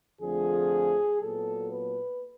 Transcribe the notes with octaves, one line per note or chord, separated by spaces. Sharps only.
F2 D3 F3 A3 G#4
A#2 F#3 B3 A4
B4